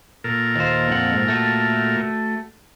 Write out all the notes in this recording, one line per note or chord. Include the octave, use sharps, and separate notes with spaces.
A#2 A4 A#4
D#2 C5
F2 F#5
G#2
A3 F#4